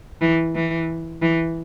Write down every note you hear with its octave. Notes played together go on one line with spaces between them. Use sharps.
E3
E3
E3